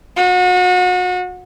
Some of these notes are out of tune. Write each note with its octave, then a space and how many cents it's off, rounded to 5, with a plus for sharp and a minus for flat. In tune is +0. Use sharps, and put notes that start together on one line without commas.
F#4 -35